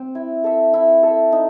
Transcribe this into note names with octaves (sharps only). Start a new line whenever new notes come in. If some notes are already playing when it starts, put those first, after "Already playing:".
Already playing: C4
E4
A4 E5
E4
A4 E5
D#4